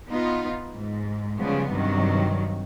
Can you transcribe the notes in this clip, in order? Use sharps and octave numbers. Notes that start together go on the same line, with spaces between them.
B3 D#4 F4
G#2
C#3 F3 G3 G#3 B3
G2 C3 D#3 F#3